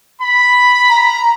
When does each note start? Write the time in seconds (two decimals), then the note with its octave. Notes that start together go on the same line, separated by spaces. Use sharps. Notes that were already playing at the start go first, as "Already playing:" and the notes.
0.21 B5
0.89 A#5